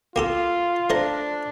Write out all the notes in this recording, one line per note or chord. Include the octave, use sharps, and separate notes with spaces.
A#3 F4 G4 A4
A3 D4 C5 A#5